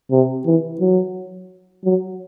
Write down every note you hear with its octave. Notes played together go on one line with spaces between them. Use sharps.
C3
E3
F#3
F#3